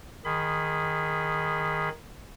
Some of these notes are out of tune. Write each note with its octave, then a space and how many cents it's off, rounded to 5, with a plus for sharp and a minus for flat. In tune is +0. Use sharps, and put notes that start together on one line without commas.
D#3 +0 G#4 -10 B5 +25